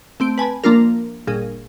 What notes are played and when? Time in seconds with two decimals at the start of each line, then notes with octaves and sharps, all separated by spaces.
0.20 A3 C4 D7
0.38 B4 G#5 A5 B5
0.64 F3 A#3 D4 F4 A#4
1.27 G1 A#2 G#4